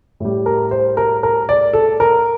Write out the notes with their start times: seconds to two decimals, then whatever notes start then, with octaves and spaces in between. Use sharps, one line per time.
0.20 A2 G3
0.46 A#4
0.71 C5
0.97 A#4
1.23 A#4
1.49 D5
1.73 A4
2.00 A#4